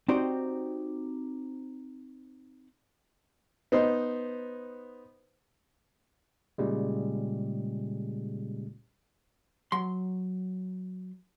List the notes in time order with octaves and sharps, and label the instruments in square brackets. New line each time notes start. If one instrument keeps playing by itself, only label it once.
[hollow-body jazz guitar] C4 D#4 F#4 G4 C5 D5
[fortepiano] B3 D#4 C5
[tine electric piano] A#2 C#3 G3 G#3
[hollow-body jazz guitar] F#3 C6